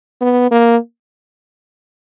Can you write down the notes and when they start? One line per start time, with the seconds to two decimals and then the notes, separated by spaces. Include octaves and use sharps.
0.21 B3
0.51 A#3